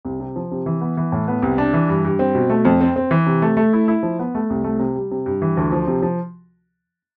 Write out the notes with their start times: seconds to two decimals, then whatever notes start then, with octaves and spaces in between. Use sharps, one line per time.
0.05 C2
0.20 C3
0.36 F3
0.51 C3
0.66 E3
0.81 B3
0.97 E3
1.12 A2
1.28 B3
1.42 C2
1.58 D4
1.74 E3
1.89 G2
2.05 G2
2.19 C4
2.35 B2
2.50 A3
2.65 F2
2.81 C4
2.96 C4
3.11 E3
3.26 C3
3.42 A3
3.57 A3
3.73 E4
3.88 E4
4.03 F3
4.19 B3
4.35 A3
4.50 C2
4.64 A3
4.79 C3
4.96 G3
5.11 C3
5.26 G2
5.42 E3
5.57 D2
5.72 F3
5.87 C3
6.02 F3